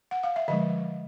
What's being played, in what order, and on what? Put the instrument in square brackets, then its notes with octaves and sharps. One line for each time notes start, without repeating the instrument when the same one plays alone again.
[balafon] F#5
F5
E5
D3 F3 G#3 D#5